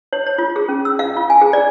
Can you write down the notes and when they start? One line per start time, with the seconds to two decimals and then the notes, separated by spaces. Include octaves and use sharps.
0.13 C#5
0.26 C#5
0.38 F4
0.56 G#4
0.69 C#4
0.85 E6
0.99 F5
1.16 F4
1.30 G#5
1.41 G#4
1.53 D5